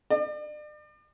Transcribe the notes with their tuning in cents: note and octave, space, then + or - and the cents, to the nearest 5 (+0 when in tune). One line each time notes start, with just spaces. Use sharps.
D5 +40